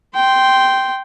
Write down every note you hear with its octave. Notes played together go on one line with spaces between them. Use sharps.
G5 C6